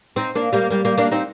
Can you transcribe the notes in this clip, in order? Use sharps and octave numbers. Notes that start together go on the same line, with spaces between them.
C4 D#4
A#3 D4
G3 A#3
G3 A#3
G3 A#3
A#3 D4
C4 D#4